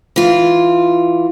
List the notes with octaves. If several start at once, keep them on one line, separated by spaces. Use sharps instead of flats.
E3 F4